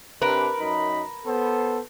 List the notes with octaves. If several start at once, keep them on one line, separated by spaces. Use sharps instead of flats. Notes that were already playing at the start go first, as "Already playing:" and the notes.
C3 D4 A#4 B4
F#2 D#4 B5
B3 A4 C5